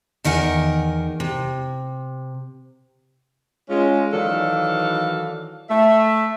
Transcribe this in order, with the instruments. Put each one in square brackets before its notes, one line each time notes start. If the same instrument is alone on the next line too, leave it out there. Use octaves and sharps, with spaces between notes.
[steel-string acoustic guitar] E2 D#3 A#4 F#5 G#5
C3
[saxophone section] G#3 C#4 F4
D#3 E3 F#3 A4 D5 F5
A3 E5